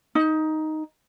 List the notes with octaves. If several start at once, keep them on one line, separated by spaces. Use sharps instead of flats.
D#4